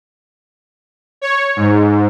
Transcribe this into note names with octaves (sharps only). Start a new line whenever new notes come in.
C#5
G#2